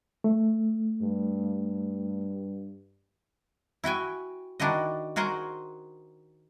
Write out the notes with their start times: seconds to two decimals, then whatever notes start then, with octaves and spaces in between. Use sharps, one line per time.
0.24 A3
1.02 G2
3.84 E4 F#4 G5 G#5
4.60 D#3 D4 E4 F#4 D#5
5.16 F#4 G#4 A#4 C5 F#5